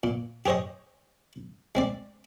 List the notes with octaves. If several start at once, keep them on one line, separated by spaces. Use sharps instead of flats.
A#2
G4 G#4 C5 C#5 D#5
G#3 C4 D5